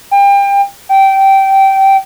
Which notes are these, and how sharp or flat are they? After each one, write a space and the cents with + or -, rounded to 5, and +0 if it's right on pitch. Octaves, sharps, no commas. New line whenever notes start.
G5 +30
G5 -15